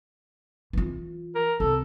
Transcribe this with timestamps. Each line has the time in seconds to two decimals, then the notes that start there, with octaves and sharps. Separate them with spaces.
0.73 E3 F4
1.35 A#4
1.60 C2 A4